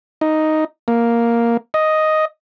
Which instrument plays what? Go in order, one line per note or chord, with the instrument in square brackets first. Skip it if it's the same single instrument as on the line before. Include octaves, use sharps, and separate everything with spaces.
[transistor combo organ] D#4
A#3
D#5